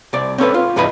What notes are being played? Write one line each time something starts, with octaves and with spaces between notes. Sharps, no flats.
C2 D5
C4 C#4 A4 B4
F4
E2 G2 E3 B4 D#5 B5